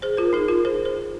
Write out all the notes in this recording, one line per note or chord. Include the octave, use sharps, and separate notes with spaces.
G#4 C5
F4 A#4
D#4 G#4
F4 A#4
G#4 C5
G#4 C5